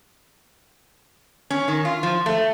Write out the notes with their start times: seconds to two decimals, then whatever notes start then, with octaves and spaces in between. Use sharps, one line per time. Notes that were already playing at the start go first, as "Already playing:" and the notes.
1.50 C#4
1.68 D#3
1.85 F4
2.03 F3
2.26 A3